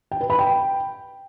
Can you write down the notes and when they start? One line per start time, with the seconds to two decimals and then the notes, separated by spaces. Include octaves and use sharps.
0.11 G5
0.21 B4
0.30 B5
0.39 G5